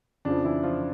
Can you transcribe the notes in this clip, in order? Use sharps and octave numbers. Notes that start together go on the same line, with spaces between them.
F2 C#3 F3 D4
E3 E4
F3 F4